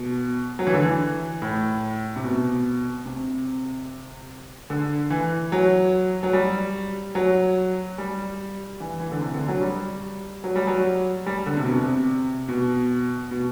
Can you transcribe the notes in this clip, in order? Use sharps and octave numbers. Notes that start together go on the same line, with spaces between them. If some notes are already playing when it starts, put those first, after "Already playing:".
Already playing: B2
F#3
E3
D3
E3
A2
C3
B2
C3
D3
E3
F#3
F#3
G3
F#3
G3
E3
E3
D3
C3
D3
F#3
G3
F#3
G3
F#3
G3
D3
C3
B2
C3
B2
B2